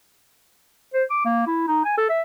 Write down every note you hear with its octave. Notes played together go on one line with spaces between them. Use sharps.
C5
D6
A#3
E4
D#4
G#5
A4
E5